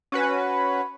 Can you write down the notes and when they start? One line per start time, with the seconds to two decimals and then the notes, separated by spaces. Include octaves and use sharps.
0.12 C#4 F#4 B4